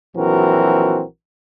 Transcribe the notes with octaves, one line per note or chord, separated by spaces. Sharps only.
A#1 E3 F#3 C4 F#4 A#4